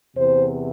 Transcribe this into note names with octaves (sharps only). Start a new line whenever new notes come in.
E2 C3 E3 C5